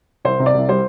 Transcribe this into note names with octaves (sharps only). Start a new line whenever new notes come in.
C2 C5
C3
D5
C2
G3 C5